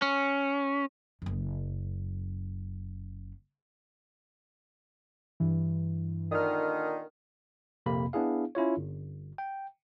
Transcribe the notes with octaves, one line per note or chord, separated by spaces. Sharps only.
C#4
F#1 F#2
G2 E3
A#2 D3 D#3 D#6 F6
A#1 F2 C3 A#3 B5
B3 D4 E4 G#4 F5
C#4 E4 F4 C#5
G1
G5